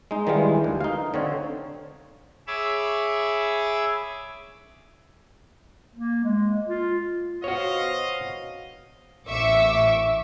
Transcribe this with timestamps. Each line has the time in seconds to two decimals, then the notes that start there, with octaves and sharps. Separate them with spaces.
0.11 G#3 D#4
0.27 D#3 E3 G3 G#3 F4
0.64 D2
0.81 D#4 F5
1.14 D3 C4 C#5
2.47 G#4 C#5 E5 B5 D6 E6
5.96 A#3
6.24 G#3
6.68 F4
7.44 B2 F#4 C5 C#5 D#5 F5
9.28 A1 E5 C#6 D6 E6